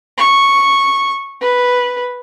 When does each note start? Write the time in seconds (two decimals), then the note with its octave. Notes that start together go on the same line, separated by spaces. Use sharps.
0.18 C#6
1.41 B4